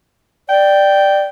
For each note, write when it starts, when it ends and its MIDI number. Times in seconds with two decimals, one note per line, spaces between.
0.49 1.22 74
0.49 1.29 79